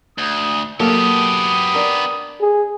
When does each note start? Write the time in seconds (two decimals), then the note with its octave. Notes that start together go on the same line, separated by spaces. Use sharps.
0.18 D2 D#6
0.80 F#3 A#3 B3 G4 A4 D#6
1.75 D4 A#4
2.41 G#4